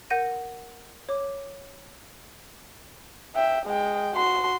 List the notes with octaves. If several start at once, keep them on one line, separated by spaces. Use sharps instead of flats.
A#4 F#5 G6 A#6 D#7
C#5 D6
E5 G5
G#3 G5
F#4 C6